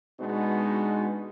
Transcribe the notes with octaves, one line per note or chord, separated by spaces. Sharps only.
B2 G#3 B3 D4 D#4 F#4